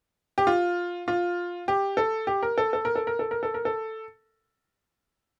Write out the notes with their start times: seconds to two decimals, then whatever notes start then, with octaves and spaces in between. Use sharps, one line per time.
0.38 G4
0.47 F4
1.08 F4
1.68 G4
1.97 A4
2.27 G4
2.43 A#4
2.58 A4
2.73 A4
2.85 A#4
2.96 A4
3.07 A#4
3.19 A4
3.31 A#4
3.43 A4
3.54 A#4
3.65 A4